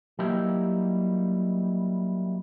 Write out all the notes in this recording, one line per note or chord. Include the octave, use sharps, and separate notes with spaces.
F#3 G3 A#3 D#4 E4 G4